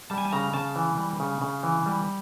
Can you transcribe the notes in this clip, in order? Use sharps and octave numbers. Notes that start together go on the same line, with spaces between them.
G3 A5
G#5
A5
C#3 A#5
C#3 A5
E3
G3
C#3
C#3
E3
G3